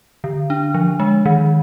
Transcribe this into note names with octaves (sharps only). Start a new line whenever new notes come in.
D3
D4
F3
G#3
D#3